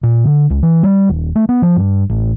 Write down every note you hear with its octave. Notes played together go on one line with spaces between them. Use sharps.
A#2
D3
C#2
E3
G3
D#1
A3
B3
F3
G2
A1